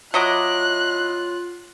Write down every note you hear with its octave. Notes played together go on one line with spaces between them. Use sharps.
F#3 E4 F4 D#5 D6 F#6